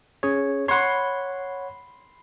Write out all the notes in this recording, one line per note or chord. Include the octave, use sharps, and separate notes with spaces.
C#4 G#4 C#5
C#5 F#5 B5 C6